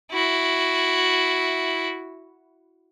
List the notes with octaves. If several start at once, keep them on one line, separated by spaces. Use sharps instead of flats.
E4 F#4